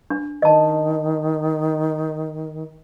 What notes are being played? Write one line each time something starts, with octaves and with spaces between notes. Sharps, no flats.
D4
D#3 D#5 A5